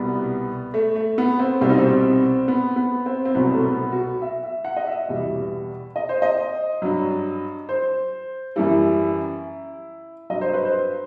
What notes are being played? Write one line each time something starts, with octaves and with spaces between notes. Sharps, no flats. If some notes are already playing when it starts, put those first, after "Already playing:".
Already playing: C2 B2 G3 B3
A3
A3
B3
C4
C2 B2 G3 C4
D#4
C4
B3
B3
C4
C4
C2 B2 F#3 B3
A3
B3
F#4
E5
E5
F#5
D#5
E5
E2 B2 G3
D#5
C5
D#5
G2 F#3
C5
F#2 E3 G3 E4
G2 F#3 D#5
C5
B4
C5